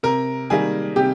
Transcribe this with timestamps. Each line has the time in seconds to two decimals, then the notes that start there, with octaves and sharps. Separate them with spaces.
0.03 C3 A#4 A#5
0.50 D#3 G3 A#3 G#4 G#5
0.96 C3 G4 G5